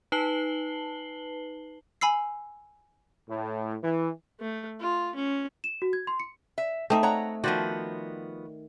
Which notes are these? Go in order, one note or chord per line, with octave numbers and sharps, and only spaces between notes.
D#4 B4 A5 C7 F#7 G7
G#5 B5 E6 C7
A2
E3
A3
F4
C#4
E7
F#4
G#6
C6
C#7
E5
A3 C4 D#4 E5 A5
C#5 F#5 A#5
D#3 F3 B3 F#4 C5 D5